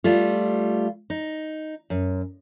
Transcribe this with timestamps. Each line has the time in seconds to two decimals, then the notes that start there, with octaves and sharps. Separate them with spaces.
0.04 G3 A3 F4
1.10 D#4
1.90 F#2